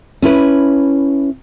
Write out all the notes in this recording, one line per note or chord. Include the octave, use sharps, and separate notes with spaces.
C#4 E4 B4